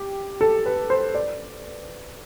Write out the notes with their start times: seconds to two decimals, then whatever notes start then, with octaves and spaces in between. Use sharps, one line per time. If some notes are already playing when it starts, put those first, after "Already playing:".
Already playing: G4
0.41 A4
0.66 B4
0.90 C5
1.14 D5